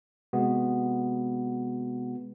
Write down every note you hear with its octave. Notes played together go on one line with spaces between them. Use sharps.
C3 G#3 B3 F#4